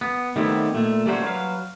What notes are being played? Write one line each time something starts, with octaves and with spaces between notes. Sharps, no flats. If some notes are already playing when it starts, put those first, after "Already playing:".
B3
D#3 G3 A3 B3 C4 E4
A#2 A3
G3 A3 A#3 C#4 F#4 C5
F#3 B4 F5